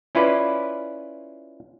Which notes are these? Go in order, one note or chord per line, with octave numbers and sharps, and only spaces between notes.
C#4 E4 F4 B4 D5